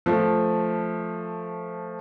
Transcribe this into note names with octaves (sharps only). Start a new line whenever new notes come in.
F3 A3